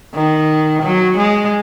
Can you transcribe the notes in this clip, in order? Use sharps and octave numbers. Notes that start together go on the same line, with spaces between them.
D#3
F#3
G#3